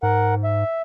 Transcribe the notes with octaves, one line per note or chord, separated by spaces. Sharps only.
G#2 A#4 F#5
E5